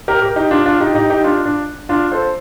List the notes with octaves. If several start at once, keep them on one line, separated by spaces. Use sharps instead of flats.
G4 A#4
G4 A#4
D#4 G4
D4 F4
D4 F4
D#4 G4
D#4 G4
D#4 G4
D4 F4
D4
D4 F4
A4 C5